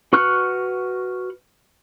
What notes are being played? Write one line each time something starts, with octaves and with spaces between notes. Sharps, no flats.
F#4 B4 C#6 F6 F#6